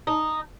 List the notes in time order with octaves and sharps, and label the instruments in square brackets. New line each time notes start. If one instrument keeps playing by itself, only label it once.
[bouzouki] D#4